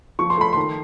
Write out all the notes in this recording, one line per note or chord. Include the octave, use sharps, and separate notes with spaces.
F3 C#6
C6
A3 B5
D#3 C6